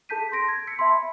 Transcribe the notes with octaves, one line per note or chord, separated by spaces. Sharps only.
G#4 A4 A5 G6 B6 D#7
C6 G6 A#6 D7
G#6
E6 B6 C#7
E5 A5 B5 C6
B5